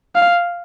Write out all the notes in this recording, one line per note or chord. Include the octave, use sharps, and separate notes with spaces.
F5